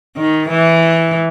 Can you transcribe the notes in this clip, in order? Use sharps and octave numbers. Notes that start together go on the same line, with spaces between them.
D#3
E3